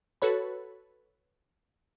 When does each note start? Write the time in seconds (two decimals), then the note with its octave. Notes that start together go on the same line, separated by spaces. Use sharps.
0.22 F#4 A4 B4 C#5 B5